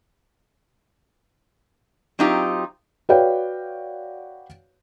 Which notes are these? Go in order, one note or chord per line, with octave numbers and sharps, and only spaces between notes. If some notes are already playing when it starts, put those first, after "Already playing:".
F#3 C4 D#4 F4 G4
F#4 B4 C#5 D5 F5 G5